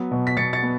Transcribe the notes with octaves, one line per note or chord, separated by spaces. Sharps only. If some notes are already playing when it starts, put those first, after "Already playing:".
Already playing: F#3 B3
B2
B6
B2 A6 C#7
A6 C#7
B3